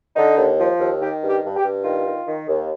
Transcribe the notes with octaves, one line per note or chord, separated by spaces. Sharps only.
D3 D#4
D#2
F3
D#2
D#3 G4
G2
G4
G2
G4
G2
D#3 F4
D#3
D#3
D#2